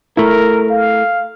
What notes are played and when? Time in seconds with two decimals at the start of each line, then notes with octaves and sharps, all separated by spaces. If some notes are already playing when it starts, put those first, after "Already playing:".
0.17 A3 E4 A#4
0.70 F5